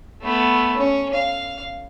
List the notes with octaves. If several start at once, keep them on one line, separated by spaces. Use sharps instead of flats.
A3 B3
C#4
F5